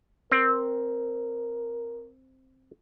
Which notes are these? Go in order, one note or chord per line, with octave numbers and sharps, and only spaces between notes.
C4 A#4